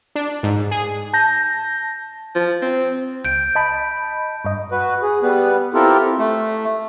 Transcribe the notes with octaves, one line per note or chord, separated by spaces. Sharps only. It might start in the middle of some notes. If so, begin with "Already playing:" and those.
D4
G#2
G#4
A5 G6 A#6
F3
C4
C#2 G6 D7
D#5 A5 B5
G2 D#5
F#4 B4
G#4
G3 B3 B4
C4 E4 F4 G4 A4 A#4
A3